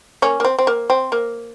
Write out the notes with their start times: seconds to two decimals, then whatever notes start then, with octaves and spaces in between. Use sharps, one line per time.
0.22 A#3 C#4
0.40 A#3
0.45 C4
0.59 C4
0.67 A#3
0.90 C4
1.12 A#3